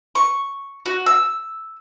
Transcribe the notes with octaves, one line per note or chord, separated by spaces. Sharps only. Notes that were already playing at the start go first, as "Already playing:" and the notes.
C#6
F#4
E6